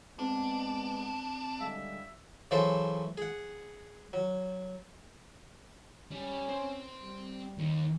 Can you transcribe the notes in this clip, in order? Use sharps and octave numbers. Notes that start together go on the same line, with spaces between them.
G#3 B3 C4 D4
D3 G3 G#3 E5 F5
C#3 E3 F#3 F#4 A4 C5
G#4 F#5
F#3
G3 C#4
C4
G3
D#2